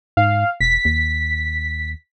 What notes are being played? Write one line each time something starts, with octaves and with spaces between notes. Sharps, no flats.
G#2 F5
E1 B6
D#2